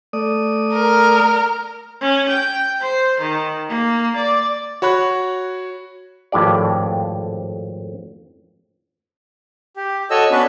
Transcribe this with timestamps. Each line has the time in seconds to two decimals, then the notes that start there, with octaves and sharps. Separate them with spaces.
0.13 A3 D5 D#6
0.74 A#4
2.01 C#4
2.29 G5
2.81 C5
3.20 D#3
3.69 A#3
4.16 D5
4.82 F#4 C#5 B5 F#6
6.32 G#1 F2 A2 G4 D5
9.76 G4
10.10 F#4 A4 C#5 D#5 E6
10.31 B3 C#4 D4 F#4 B4